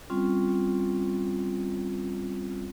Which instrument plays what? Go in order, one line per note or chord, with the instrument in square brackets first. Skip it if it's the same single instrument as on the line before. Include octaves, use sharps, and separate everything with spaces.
[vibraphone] G3 C4 C#4 F4